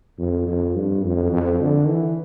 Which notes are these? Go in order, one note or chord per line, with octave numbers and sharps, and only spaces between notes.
F2
F2
G2
F2
F2
D3
E3